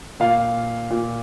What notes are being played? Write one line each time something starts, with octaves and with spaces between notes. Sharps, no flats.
A#2 F5
A#2